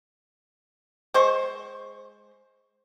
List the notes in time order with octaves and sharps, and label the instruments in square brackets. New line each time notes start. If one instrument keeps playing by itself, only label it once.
[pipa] G#3 C5 C#6